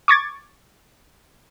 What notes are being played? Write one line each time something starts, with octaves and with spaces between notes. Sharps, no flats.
C#6 D6 G#6 A6